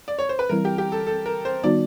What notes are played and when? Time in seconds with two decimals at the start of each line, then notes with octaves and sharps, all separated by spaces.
0.08 D5
0.19 C#5
0.29 C5
0.39 B4
0.49 E3 G3 C4 E4 A#4
0.65 G4
0.78 G4
0.92 A4
1.07 A4
1.26 A#4
1.45 C5
1.64 D#3 G3 B3 D#4 F#4 D5